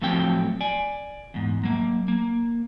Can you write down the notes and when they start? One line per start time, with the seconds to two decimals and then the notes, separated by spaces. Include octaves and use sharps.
0.02 A2 F3 F#3 A3 C4 G5
0.61 D5 G#5
1.34 E2 G#2
1.63 F#3 A#3
2.08 A#3